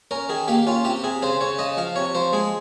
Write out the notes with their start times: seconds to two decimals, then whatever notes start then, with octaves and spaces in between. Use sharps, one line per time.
0.11 C#4 A#4
0.29 D#3 G#4
0.48 A#3 G4
0.67 C#4 F4
0.84 C3 G4
1.04 C3 G#4
1.22 C#3 C5
1.41 C#3 C#5
1.59 C#3 D#5
1.77 F3 F5
1.96 C3 C#5
2.15 F3 C5
2.33 G#3 G#4